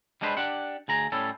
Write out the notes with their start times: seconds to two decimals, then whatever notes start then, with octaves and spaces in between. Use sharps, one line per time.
0.21 G3 G#3 D4 G4 B4 C5
0.37 D4 G4 F#5
0.88 D2 G#4 A#5
1.12 A2 G3 C#4 A4